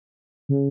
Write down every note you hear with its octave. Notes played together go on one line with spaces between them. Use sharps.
C#3